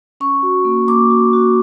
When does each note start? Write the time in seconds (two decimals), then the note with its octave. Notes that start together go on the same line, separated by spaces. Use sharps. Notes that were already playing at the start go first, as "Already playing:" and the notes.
0.20 C#4 C#6
0.43 F#4
0.65 A#3
0.88 A#3 D6
1.10 F#4
1.33 F#4